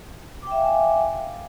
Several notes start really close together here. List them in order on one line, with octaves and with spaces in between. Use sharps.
D6 G5 E5 F5 G#5